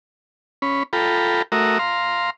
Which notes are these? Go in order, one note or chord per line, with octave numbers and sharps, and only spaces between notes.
C#4 B5
F4 A4 G5 A#5 B5
A3 F#4 A#4 E5 A#5 D#6
F5 A#5 C6